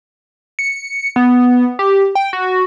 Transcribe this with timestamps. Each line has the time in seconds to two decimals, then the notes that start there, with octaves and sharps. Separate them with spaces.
0.59 C#7
1.16 B3
1.79 G4
2.15 G5
2.33 F#4